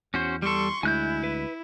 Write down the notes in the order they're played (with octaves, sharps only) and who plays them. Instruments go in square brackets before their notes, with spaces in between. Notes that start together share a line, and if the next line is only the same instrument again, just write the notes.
[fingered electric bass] E2 [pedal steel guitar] C#4 F#4 C5
[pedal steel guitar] G3 A4 [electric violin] C6 C#6
[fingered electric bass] D2 G#3 [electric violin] E4 [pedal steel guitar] G#5 F#6 G6
[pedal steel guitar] B4